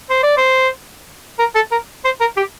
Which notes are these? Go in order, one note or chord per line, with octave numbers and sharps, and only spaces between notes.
C5
D5
C5
A#4
A4
A#4
C5
A#4
G4